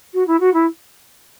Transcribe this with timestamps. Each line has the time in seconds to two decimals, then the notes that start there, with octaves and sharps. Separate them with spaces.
0.13 F#4
0.27 E4
0.40 F#4
0.53 E4